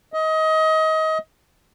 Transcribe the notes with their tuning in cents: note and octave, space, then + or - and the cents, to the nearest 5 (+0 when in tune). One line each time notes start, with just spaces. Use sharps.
D#5 +25